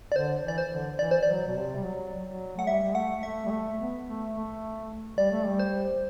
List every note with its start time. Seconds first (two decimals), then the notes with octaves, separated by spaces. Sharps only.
0.12 D5
0.16 D3 C5
0.44 E3 D5
0.58 C5
0.71 D3
0.99 E3 D5
1.11 C5
1.23 D5
1.28 F#3
1.47 B2
1.55 C3
1.76 G3
1.83 F#3
2.26 F#3
2.57 A3 F#5
2.67 G3 E5
2.83 G3
2.95 A3 F#5
3.23 A3 E5
3.46 G3
3.51 A3
3.79 B3
4.06 A3
4.34 A3
5.18 G3 D5
5.31 A3
5.45 G3
5.59 C5